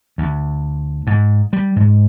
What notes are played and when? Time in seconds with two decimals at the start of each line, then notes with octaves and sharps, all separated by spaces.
0.18 D2
1.07 G#2
1.53 G3
1.76 G#2